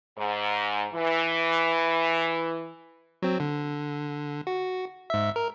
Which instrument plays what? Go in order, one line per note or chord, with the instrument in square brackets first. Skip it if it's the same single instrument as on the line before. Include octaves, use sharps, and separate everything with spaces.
[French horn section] G#2
E3
[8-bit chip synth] F#3 C4
D3
F#4
G#2 E5
A#4